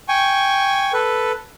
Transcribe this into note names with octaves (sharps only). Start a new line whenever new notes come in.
G5 G#5 C#6
A4 B4